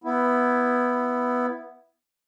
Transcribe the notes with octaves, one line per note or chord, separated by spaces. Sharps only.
B3 E4